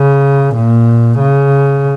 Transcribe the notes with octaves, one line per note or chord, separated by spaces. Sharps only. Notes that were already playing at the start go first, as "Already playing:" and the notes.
Already playing: C#3
A#2
C#3